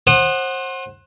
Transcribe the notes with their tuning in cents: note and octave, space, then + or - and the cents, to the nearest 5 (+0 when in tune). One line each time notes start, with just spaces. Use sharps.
C5 +30 F#5 +0 D#6 -30